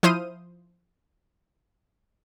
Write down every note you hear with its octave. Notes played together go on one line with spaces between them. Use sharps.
F3 E4 C5 D#6 F6 D#7